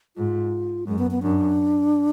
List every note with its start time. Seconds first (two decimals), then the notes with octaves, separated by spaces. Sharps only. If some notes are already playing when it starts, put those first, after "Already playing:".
0.17 G#2 F4
0.87 F#2 G#3
0.99 B3
1.11 B3
1.22 F#2 D4